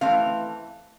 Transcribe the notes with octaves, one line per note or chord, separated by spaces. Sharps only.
E3 A3 C4 F5